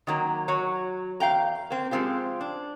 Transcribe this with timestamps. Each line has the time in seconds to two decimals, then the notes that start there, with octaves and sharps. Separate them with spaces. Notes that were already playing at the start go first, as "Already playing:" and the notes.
0.07 D#3 F#3 A#3
0.48 F#3 F#4 C#5
1.20 E2 F5 G5 A#5
1.70 A#3 C4
1.91 F3 G#3 C4 F4 G4
2.41 D4